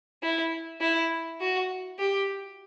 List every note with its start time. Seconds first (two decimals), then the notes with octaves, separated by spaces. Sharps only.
0.23 E4
0.81 E4
1.40 F#4
1.99 G4